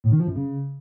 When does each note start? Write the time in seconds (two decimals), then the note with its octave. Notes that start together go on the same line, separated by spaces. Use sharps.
0.04 A2
0.12 D#3
0.20 F3
0.27 F#2
0.35 C#3